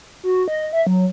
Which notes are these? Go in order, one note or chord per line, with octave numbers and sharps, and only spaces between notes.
F#4
D#5
E5
F#3